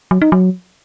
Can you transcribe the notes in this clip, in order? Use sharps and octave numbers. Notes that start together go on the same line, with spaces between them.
F#3
D#4
F#3